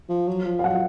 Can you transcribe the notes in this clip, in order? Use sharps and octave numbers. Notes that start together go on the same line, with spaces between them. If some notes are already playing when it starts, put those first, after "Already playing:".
F3
F#3
F3
F5
F#3 F#5